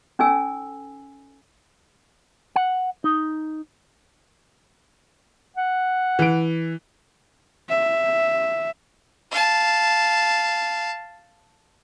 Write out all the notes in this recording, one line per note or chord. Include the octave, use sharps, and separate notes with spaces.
C#4 D#4 A4 G#5 E6
F#5
D#4
F#5
E3 D7
E5
F5 A5